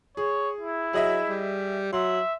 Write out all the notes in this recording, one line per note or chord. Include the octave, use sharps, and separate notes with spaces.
G#4 C#5
E4
F#3 G#4 D#5 E5
G3
F#3 E5 C6